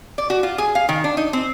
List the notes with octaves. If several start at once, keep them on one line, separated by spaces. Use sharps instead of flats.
D5
F#4
F4
G#4
F5
D#3
D4
D#4
C4